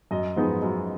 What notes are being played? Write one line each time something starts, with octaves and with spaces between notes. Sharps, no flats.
F#2 D#5
F3 G#3 B3 D#4
F#2